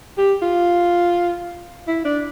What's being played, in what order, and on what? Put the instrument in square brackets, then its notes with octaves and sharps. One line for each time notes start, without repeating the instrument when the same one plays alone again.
[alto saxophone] G4
F4
E4
D4